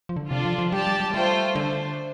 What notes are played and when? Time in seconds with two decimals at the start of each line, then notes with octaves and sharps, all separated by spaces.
0.09 F3
0.16 D3
0.30 C3 D4 F4 A4 D5
0.45 F3
0.59 F3
0.72 G3 G4 D5 A5
0.87 G3
1.00 G3
1.14 G3 A3 F4 C5 G5
1.55 D3 A3 D4 A4 C5